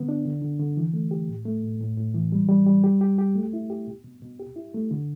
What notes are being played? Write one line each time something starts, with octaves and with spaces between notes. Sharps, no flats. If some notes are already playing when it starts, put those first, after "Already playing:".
Already playing: D3 B3
D4
D3
D3
D3
E3
A3
G4
A2
A3
A2
A2
A2
E3
G3
G3
G3
G4
G4
G4
A3
E4
G4
B2
B2
B2
G4
E4
A3
D3